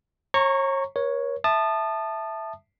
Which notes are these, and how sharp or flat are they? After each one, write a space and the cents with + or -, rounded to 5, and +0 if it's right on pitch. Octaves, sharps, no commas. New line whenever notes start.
C#5 -35 A#5 -15 C#6 +0
A#4 +40 C#5 +0
E5 +0 A5 +0 D#6 -30